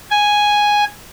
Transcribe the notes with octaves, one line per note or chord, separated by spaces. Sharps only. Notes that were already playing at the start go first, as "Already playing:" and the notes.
G#5